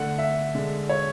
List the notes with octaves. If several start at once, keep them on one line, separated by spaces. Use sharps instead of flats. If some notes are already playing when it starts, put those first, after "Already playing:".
Already playing: D3 A3 F#5
E5
D3 G#3
C#5